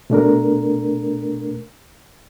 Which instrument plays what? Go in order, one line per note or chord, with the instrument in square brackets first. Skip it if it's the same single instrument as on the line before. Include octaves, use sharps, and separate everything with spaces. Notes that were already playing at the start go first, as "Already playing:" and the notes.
[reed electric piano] B2 A3 D4 A#4